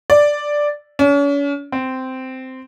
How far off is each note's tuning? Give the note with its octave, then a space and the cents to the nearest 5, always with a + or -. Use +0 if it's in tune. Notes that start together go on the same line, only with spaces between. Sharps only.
D5 +0
C#4 +40
C4 -10